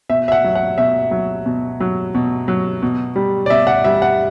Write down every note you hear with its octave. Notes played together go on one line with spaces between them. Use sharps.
B2 E5
E5
F#5
F#3
F#5
B2 E5
F#3
B2
F#3
B2
F#3
B2
G3
D5
B2 E5
F#5
G3 E5
F#5